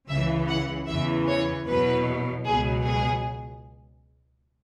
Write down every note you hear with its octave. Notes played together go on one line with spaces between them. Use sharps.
C#2 C#3 E3 E5
F#5
E2 C#3 E3 E5
C#5
E2 B2 F#3 B4
C#2 B2 F#3 G#4
G#4